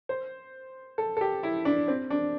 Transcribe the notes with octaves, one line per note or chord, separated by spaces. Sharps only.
C5
A4
A4
G4
E4
D4
C4
D4